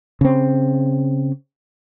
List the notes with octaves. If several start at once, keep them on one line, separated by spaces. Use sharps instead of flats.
C#3 C4